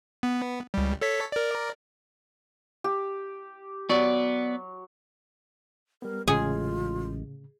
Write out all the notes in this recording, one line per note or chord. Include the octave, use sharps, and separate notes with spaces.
B3
C#2 G3
A4 C#5 B6
A#4 D5
G4
F#3 B3 D5
G3 B3 A#4
A1 A2 C#3 G#3 F4 G#4